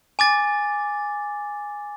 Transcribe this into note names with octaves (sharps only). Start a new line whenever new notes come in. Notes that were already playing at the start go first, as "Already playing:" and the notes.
G#5 D6 A6